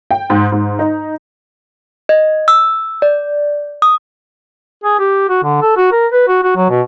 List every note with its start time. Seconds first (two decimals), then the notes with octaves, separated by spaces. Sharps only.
0.11 G5
0.30 G#2
0.52 G#2
0.79 D#4
2.09 D#5
2.48 E6
3.02 D5
3.82 D#6
4.84 G#4
4.99 G4
5.29 F#4
5.43 D3
5.61 A4
5.76 F#4
5.92 A#4
6.12 B4
6.27 F#4
6.43 F#4
6.56 F#3
6.69 B2